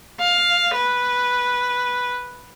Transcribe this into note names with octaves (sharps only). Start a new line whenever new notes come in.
F5
B4